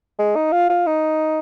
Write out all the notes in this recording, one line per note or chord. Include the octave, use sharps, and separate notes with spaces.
G#3
D#4
F4
F4
D#4